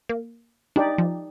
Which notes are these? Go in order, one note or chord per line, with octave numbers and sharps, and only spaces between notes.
A#3
D4 D#4 G4 D5
F3